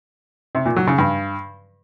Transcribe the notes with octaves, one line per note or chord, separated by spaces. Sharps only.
C3
A#2
F#3
C#3
G2